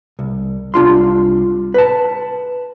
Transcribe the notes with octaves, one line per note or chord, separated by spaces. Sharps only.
C2
C2 D4 F4 C6
B4 A5